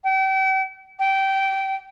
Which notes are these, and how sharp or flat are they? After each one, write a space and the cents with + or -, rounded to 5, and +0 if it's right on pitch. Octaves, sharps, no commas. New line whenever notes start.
G5 -40
G5 -20